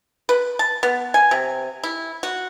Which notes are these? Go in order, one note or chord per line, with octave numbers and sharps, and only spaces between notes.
B4
A5
B3
G#5
C3
E4
F#4